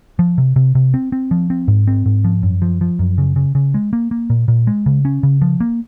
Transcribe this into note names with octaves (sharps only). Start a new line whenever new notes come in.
F3
C3
C3
C3
C4
C4
F3
C4
G#2
C4
G#2
F3
F#2
F3
F3
F#2
C#3
C#3
C#3
G#3
A#3
A#3
A#2
A#2
G#3
C#3
C#4
C#3
F3
A#3